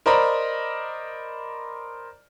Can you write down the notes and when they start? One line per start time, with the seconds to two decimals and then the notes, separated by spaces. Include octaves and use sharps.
0.06 A#4 C5 D5 D#5 A#5 B5